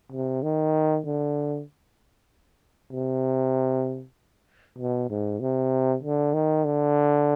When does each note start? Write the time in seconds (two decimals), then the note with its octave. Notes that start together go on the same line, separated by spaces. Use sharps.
0.12 C3
0.43 D#3
1.06 D3
2.92 C3
4.78 B2
5.10 G#2
5.40 C3
6.03 D3
6.34 D#3
6.65 D3